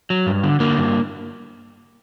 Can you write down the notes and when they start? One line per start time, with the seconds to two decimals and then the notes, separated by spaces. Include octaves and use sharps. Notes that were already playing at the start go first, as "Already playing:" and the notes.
0.10 F#3
0.27 G2
0.43 D3
0.60 D3 A#3
0.77 G2